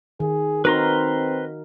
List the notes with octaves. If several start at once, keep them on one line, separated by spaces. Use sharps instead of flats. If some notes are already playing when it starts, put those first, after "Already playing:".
D#3 G#4
C4 D#4 F#4 A#4 B4 A#5 C6